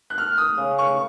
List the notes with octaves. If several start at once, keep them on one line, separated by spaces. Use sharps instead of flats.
F#6
F6
D#6
C#3
C#6